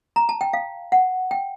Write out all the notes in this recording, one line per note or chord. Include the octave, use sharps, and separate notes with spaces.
A#5
A5
G5
F5
F#5
G5